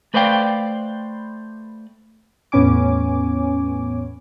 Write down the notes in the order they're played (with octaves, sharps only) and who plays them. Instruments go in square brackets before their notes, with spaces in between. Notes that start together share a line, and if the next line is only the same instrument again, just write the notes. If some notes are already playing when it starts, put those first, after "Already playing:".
[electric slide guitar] A3 B4 C5 D5 F5 G5
[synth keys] E2 A2 B3 C#4 G#5 D6